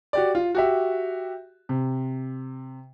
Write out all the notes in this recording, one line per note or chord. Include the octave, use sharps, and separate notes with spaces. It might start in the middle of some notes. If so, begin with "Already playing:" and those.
F#4 G4 D5
F4
F#4 G4 E5
C3